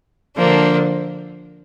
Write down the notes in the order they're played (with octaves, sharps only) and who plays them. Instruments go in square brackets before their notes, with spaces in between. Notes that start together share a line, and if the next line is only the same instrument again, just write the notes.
[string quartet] D3 F3 A#3 D4